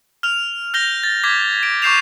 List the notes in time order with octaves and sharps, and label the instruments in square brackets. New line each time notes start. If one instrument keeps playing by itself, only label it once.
[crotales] F6 F7
F6 G6 A#6 F7 G7
A6
D6 G#6 B6
D7
C#6 D6 G6 C7 E7 F7